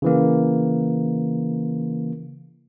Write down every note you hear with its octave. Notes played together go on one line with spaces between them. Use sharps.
C#3 E3 A#3